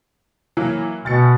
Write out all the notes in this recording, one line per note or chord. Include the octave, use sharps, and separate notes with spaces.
E3 F#3 A#3
D2 B2 A6 C#7